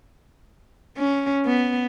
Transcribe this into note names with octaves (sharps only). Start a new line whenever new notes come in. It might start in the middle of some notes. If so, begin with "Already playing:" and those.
C#4
B3